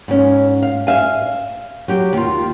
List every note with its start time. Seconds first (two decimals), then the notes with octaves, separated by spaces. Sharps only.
0.08 G#2 C#4
0.62 F5
0.87 E5 F5 G#5
1.88 F#3 G4
2.13 D#2 F4